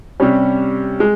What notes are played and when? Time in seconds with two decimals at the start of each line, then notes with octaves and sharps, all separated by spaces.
0.20 C3 G3 C#4
1.00 G#3